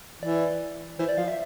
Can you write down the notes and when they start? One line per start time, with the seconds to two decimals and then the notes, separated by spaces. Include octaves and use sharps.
0.22 E3 D5
0.99 E3 C5
1.09 D5
1.18 F3 F5
1.28 E5